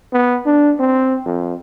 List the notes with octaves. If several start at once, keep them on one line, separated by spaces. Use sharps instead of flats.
B3
D4
C4
F2